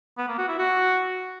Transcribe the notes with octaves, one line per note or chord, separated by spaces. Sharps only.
B3
A#3
F#4
E4
F#4